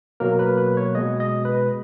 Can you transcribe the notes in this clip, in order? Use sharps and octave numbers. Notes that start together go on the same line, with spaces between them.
B2 F#3 A#3 A#4
B4
B4
C#5
B2 G#3 D#5
D#5
B4